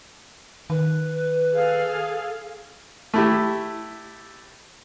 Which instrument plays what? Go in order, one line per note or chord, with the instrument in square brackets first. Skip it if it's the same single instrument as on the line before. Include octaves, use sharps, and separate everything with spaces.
[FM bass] D#3 [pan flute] B4
[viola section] G#4 A4 F5
[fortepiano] A3 E4 G4